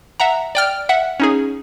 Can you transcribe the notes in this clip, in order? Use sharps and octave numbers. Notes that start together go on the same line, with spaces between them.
E5 F#5 A#5
D5 G5 F6
E5 F#5
C#4 D#4 G#4